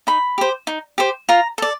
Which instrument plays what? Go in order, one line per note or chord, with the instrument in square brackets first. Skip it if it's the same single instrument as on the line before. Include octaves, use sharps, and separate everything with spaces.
[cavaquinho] D#4 B5
G4 C5
D#4
G4 C5
F4 A#5
A4 D5